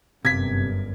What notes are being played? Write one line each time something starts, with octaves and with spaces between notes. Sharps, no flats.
G1 F#2 C3 G#6 B6